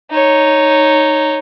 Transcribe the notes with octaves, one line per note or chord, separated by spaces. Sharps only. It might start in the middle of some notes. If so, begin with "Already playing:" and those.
D#4 C#5